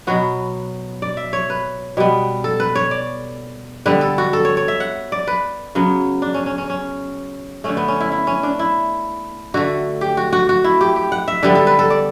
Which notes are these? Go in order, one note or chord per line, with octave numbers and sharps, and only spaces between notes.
B2 F#3 B3 F#4
D5
E5
C#5
B4
B2 G3 B3
A4
B4
C#5
D5
D3 G3 B3 B4
A4
F#4
A4
C#5
C#5
E5
F#5
D5
B4
C#3 F#3 B3
D4
C#4
C#4
C#4
C#4
D3 A3 C#4
B3
C#4
E4
E4
C#4
D4
E4
D3 A3 F#4
G4
F#4
F#4
F#4
E4
G4
G4
F#5
E5
D3 G3 B3 A4
A4
B4
A4
D5